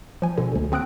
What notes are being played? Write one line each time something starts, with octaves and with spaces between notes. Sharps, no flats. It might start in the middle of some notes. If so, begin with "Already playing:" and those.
F3 G#5
B2 D3
D2
D3 C4 D#6 F#6 D7